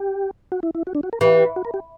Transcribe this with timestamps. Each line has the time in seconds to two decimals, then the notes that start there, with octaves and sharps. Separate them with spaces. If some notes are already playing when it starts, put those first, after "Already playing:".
Already playing: G4
0.52 F#4
0.63 E4
0.75 E4
0.87 F#4
0.95 D4
1.03 F#4
1.13 A#4
1.21 E3 G4
1.56 F#4
1.65 A#4
1.74 G4